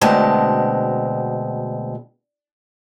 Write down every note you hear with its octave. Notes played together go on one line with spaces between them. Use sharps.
D2 B2 G#3 C4 A5